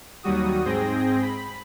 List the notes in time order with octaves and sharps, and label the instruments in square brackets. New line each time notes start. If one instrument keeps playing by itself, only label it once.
[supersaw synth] D#2 F#3 G3 F#4 D#6
G#2 C4 G#4 G5 A#6
B5